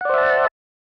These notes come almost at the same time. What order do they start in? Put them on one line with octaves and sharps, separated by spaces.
F#5 D5 C5 E5 A5